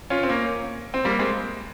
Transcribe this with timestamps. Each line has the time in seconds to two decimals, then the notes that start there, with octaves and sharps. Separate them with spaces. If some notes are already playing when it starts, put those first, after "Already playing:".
0.10 C#4 F4
0.23 C4
0.29 A#3 C#4
0.94 C4
1.05 G3 A#3
1.19 G#3 C4